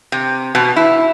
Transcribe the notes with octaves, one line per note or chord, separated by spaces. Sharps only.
C3
B2
E4